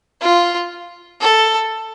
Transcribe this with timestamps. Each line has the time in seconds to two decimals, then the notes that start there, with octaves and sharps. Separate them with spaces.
0.21 F4
1.21 A4